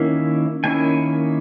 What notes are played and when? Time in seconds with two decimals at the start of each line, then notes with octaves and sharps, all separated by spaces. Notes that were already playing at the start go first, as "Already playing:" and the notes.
Already playing: D#3 A#3 C#4 E4 E5
0.64 D#3 A#3 C#4 E4 G#5